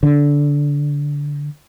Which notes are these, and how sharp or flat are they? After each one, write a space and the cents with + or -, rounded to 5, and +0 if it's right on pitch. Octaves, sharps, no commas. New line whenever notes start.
D3 -15